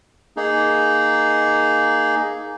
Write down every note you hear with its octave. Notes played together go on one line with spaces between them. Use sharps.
A#3 D#4 G#4